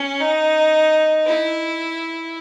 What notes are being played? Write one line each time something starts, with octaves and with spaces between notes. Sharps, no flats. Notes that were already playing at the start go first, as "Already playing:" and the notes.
Already playing: C#4
D#4
E4